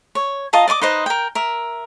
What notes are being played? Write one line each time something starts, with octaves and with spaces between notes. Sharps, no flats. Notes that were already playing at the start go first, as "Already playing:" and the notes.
C#5
F4 D#5 A5 A#5
D5 D#5 C#6 D6
D#4 B4 C5 D#5
A#4 G5
A#4 E5